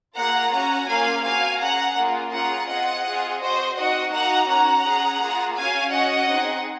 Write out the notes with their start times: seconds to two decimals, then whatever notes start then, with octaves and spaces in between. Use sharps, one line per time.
0.16 A#3 F4 G#4 F#5 A#5
0.52 C#4 F#4 F#5 A#5
0.88 A#3 C#4 F4 G#4 F5 G#5
1.24 C4 F#4 F5 G#5
1.60 C#4 G#4 F#5 A#5
1.97 A#3 C#4 F4 G#4
2.32 C#4 F4 G#4 F#5 A#5
2.68 C4 F4 G#4 D#5 F#5
3.05 C4 F4 G#4
3.40 C4 F#4 C5 D#5
3.76 C4 D#4 F#4 D#5 F#5
4.12 A#3 D#4 F#4 F#5 A#5
4.48 C#4 F#4 F#5 A#5
4.84 C#4 G#4
5.20 A#3 F4 G#4
5.56 C#4 F#4 F5 G#5
5.92 C#4 F#4 D#5 F#5
6.29 C4 D#4 G#4